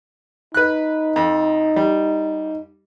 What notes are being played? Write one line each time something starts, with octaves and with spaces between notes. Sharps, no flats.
D#4 B4 F#6
F2
G3